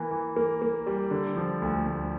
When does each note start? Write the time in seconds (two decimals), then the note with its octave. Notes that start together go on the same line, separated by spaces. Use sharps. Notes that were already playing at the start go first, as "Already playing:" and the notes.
Already playing: E3 A#3
0.11 E3
0.36 A#3
0.62 A#3
0.86 G3
1.11 D3
1.36 F3
1.62 D2
1.86 D2